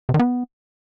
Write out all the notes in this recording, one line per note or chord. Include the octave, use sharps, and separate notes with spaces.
C3
D#3
B3